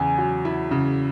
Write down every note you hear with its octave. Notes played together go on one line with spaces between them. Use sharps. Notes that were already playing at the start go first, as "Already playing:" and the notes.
Already playing: E2 C#3 E4 G#5
F#3
E4
C#3